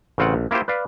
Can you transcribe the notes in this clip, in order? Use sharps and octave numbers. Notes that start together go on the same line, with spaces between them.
A1 C#3 C4 F4 F#5
A#1
A#3 E4 F4 G4 C5
B4 D5 F5